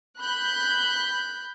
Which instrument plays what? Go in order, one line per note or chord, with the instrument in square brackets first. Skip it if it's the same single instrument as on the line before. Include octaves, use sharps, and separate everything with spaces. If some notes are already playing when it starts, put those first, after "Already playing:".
[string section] B5 F#6 G6